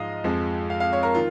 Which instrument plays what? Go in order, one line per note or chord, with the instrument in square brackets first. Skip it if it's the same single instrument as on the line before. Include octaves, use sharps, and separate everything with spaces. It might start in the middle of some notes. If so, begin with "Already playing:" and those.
Already playing: [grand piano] G#2 F3 G#3 D#5 F5
F2 F3 G#3
F5
F5
C#5
A#4
D#3 F4